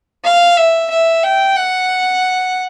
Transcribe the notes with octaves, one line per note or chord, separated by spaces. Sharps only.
F5
E5
E5
G5
F#5